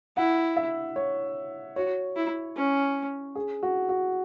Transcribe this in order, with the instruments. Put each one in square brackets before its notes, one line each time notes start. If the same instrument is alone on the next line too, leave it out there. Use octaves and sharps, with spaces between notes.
[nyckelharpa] E4 [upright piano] F#5
[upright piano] E5
C#5
[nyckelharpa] F#4 [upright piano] C#5
[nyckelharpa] E4
C#4
[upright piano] G#4
F#4
F#4